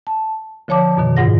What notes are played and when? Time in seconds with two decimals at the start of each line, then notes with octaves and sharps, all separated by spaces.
0.07 A5
0.68 D3 F3 C#5 A5 D6
0.97 F#2 B2 D#3
1.17 G#2 F4 F#5 A#6